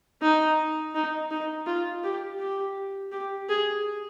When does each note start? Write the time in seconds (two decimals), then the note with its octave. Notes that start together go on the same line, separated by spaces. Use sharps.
0.22 D#4
0.94 D#4
1.31 D#4
1.66 F4
2.04 G4
2.40 G4
3.12 G4
3.49 G#4